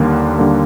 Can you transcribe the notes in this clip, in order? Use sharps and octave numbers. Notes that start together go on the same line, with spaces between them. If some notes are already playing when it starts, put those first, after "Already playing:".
Already playing: D#2 D3 G3 A#3
D3 G3 A#3